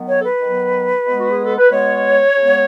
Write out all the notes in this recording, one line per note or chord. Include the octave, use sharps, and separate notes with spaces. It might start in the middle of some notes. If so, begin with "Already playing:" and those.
Already playing: D#3 F#3 B3
C#5
A4
B4
D#3 F#3 B3
B2 G#3 B3
F#4
G#4
A4
B4
B2 G#3 B3 C#5
C#3 G#3 B3